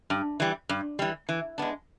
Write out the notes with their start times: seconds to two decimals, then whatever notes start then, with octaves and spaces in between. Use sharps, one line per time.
0.10 G2
0.40 E3 G3
0.69 G2
0.99 E3 G3
1.29 E3
1.58 G#3 B3 D4